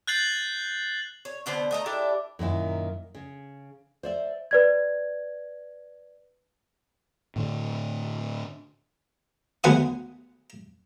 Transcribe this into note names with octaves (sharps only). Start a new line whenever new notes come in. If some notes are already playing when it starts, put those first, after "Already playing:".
F#6 G6 A6 C7 F#7
C#5
B2 D3 B3 C5
A3 D#5 A#5
D4 E4 G4 A4
F#2 A#2 D#3 E4
C#3
C5 D5 E5
B4 D5 G#6
A2 D3
D2 F#3 B3 F#5 G#5 D#6